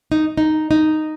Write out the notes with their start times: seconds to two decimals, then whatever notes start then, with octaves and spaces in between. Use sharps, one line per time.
0.12 D#4
0.37 D#4
0.71 D#4